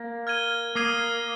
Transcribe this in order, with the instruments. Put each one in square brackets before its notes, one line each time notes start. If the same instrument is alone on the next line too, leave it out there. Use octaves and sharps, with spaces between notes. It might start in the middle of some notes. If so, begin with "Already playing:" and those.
Already playing: [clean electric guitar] A#3
[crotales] F6 G#6 D#7 G7
[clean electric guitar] A#3 [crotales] D#6 G#6 C7 D#7 G7